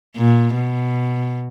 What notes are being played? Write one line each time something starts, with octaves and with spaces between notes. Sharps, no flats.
A#2
B2